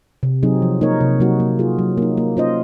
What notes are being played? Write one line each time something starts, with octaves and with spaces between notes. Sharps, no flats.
C3
F#3 C4 D#4 G#4
F3
A#3 D#4 A#4 C#5
C3
F#3 A#3 D#4 F#4
A#3
F4 G#4
F#3
A#3 D#4
A#3
C#4 F4 C5 D#5